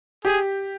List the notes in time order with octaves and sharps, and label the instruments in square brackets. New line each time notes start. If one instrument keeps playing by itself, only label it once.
[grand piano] G4 [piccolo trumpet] G#4